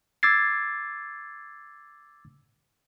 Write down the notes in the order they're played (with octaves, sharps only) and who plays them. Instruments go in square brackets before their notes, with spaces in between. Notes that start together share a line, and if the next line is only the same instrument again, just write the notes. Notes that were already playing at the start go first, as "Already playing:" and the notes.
[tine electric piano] D6 E6 G#6 A6 C7